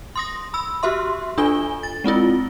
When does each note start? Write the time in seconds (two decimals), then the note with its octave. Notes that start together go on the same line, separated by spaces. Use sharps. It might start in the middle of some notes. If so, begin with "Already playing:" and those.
0.16 C6 D#6 A#6
0.54 B5 E6
0.83 F#4 G4 E5 C6
1.38 D4 F4 A4 G#5 G7
1.83 A6
2.04 G#3 C4 E4 F4